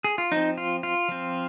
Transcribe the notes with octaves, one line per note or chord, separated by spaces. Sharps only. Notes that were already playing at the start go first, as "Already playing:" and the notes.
G#4
F4
F3 C4 D#4
F4
F4
F3 C4